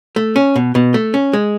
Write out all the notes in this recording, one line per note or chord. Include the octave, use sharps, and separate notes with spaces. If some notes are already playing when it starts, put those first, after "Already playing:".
A3
C#4
B2
B2
A3
C#4
G#3